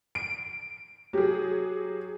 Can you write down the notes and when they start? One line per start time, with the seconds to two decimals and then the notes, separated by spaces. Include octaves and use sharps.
0.15 D7
1.13 F#3 G4 G#4